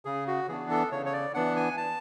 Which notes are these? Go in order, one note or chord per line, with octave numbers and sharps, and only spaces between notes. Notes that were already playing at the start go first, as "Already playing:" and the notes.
C#3 G#4
F#4
E3 B3 D4 G#4
A4
C#3 C#5
C#5
D5
E3 B3 D4 F#5
G#5
A5